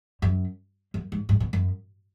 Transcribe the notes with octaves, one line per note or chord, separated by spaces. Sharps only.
F#2
F#2
G#2
G#2
B2
F#2